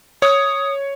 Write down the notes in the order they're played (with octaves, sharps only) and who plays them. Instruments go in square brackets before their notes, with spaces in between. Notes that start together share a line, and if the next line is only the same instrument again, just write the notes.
[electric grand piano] C#5 [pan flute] D#6